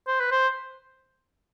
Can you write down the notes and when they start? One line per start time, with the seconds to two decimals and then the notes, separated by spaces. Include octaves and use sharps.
0.07 C5
0.20 B4
0.31 C5